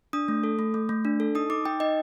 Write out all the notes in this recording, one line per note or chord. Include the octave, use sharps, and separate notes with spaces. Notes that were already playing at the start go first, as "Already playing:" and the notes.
D4 D#6
A3
A4
A3
A3
A3
D4
A4
D#4 D#6
D#4 D6
D#4 G5
D#4 D#5